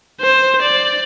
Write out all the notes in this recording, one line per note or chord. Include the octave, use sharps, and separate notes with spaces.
C5
D5